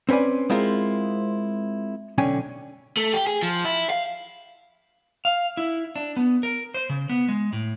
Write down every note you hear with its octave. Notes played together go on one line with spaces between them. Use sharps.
C4 C#4 B4 D5 G#5
G#3 C4 E4 F4 A#4 C5
B1 D3 C#4 G5 G#5
A3
G4
G#4
F3
E4
F5
F5
E4
D4
B3
A#4
C5
C#3
B3
G#3
A2